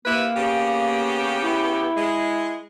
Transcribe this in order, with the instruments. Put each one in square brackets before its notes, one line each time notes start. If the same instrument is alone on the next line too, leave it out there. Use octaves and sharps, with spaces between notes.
[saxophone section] C3 E4 B4 [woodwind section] A#3
[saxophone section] C#3 B3 G4
[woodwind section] E4
[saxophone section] G#3